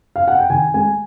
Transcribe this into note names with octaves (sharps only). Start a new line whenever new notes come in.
F5
F#5
G5
D#3 G#5
G#3 G#5